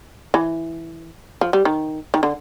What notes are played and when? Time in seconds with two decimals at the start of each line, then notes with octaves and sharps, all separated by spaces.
0.34 E3
1.41 F3
1.53 G3
1.65 D#3
2.14 D#3
2.23 D3